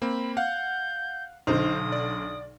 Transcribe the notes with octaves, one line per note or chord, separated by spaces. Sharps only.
A#3 C4 B5
F5 F#5 G6
B1 D3 D#4 C5 D#6
D5